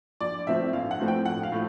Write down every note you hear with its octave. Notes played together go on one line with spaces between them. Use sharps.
A#1 D5
A2 F3 A3 C4 E5
A#1 F5
F#5
A2 F3 A3 C4
G5
A#1 F#5
F5
A2 F3 A3